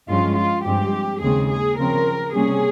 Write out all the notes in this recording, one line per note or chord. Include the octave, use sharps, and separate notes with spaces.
G2 F3 G#3 C#4 F4
F4
G2 F3 G#3 C4 G4
D#2 C#3 G#3 C4 G#4
G#4
C#3 F3 C4 A#4
C3 G3 A#3 C#4 G#4